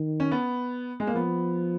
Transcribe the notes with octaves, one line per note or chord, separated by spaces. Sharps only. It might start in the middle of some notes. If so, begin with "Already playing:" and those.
Already playing: D#3
C#4
B3
G#3
A#3
F3 B3